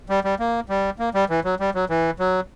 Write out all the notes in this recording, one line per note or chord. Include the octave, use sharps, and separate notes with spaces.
G3
G3
A#3
G3
A#3
G3
E3
F#3
G3
F#3
E3
F#3